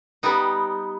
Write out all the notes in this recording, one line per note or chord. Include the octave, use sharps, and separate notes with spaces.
G3 B3 D#4